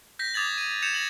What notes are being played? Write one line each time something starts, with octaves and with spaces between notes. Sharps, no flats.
G6 A#6 B6
D6 D#6 G#6 A6 F#7
D#7
G6 G#6 C#7 E7 F7
A6 A#6 F#7